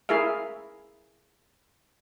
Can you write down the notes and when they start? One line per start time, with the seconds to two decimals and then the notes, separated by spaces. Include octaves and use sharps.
0.09 E4 G#4 A#4 E5 F5